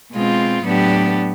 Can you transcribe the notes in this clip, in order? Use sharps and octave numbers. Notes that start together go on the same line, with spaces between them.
B2 G#3 C4 F4
A2 F#3 B3 D4 G4